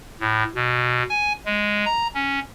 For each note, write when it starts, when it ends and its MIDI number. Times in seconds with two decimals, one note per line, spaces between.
0.20 0.44 45
0.55 1.03 47
1.09 1.33 80
1.46 1.85 56
1.85 2.07 82
2.15 2.40 61